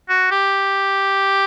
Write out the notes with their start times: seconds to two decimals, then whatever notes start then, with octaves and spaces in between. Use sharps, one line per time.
0.09 F#4
0.31 G4